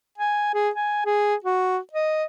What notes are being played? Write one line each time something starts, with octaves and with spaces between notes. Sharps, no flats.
G#5
G#4
G#5
G#4
F#4
D#5